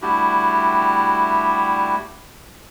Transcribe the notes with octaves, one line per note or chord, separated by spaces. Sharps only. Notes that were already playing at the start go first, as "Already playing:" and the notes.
G3 A3 D4 E4 F#4 G4